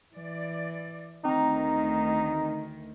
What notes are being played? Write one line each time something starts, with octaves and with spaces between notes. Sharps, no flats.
E3 D5
D2 D#3 C4 D#4 A#5